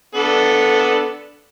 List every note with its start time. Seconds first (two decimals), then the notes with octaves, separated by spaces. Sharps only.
0.15 B3 D4 A4